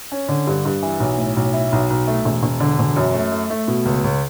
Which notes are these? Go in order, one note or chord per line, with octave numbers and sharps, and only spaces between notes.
C#4
D3
G2
G2
E3
B1
A2
B1
E4
B1
B1
A3
E1
E1
D3
E1
F#2
A3
A3
A3
B2
C#2
C#2